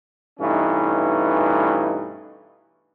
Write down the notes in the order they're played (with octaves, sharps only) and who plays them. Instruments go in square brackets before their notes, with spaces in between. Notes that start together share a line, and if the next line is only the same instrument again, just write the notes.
[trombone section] G2 B2 E3 A3 C#4 D#4